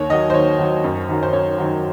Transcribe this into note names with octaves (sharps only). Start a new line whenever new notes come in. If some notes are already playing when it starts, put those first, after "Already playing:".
Already playing: D#2 C#5
D#3 F#3 D#5
C5
D#2 C#5
D#3 F#3
F#2
D#3 F#3
C5
F#2 C#5
D#3 F#3